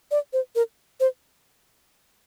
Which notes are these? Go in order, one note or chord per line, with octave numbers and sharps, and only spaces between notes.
D5
C5
A#4
C5